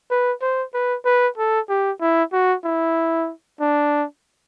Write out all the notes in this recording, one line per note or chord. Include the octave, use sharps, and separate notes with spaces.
B4
C5
B4
B4
A4
G4
E4
F#4
E4
D4